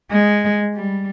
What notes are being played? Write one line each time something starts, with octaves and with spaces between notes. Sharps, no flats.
G#3
G3